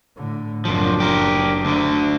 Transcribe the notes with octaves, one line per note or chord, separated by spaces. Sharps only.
A2 D3
F#1 F#2 F3 D4
G4 A#4
D2 D3